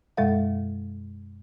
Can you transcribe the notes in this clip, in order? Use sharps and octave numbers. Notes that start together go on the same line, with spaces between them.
F#2 B2 G#3 A4 E5 F5